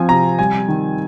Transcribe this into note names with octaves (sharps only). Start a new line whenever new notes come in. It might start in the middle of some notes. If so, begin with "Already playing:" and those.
Already playing: F3 C4 G#5
C3 A#5
G3 G#5
D#3